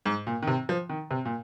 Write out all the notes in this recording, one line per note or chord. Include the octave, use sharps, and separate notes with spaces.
G#2
A#2
D#3
C3
F3
D#3
C3
A#2